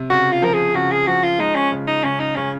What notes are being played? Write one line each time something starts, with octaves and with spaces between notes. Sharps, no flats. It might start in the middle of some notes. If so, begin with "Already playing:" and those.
Already playing: C3
C#3 F#4
F4
F3 A#4
G#4
C#3 F#4
G#4
F3 F#4
F4
G#3 D#4
C#4
C#3
D#4
C#3 C#4
D#4
C#3 C#4